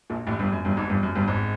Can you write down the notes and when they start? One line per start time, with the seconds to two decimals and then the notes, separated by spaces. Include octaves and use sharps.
0.10 A#1 A#2
0.27 A1 A2
0.39 G1 G2
0.52 F#2
0.65 G1 G2
0.77 G#1 G#2
0.90 G1 G2
1.03 F#2
1.15 G1 G2
1.27 G#1 G#2